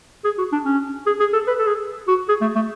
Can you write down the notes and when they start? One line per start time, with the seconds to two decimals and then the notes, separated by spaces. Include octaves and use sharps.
0.25 G#4
0.38 F#4
0.52 D4
0.65 C#4
1.06 G#4
1.20 G#4
1.33 A4
1.47 B4
1.59 A4
1.67 G#4
2.08 F#4
2.29 G#4
2.41 A3
2.55 A3